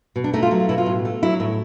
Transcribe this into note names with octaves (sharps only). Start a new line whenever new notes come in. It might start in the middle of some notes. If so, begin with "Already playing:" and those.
B2
D4
A3 D#4
F4
F#3
F4
B2 E4
F4
A2
A3
F#3 E4
A2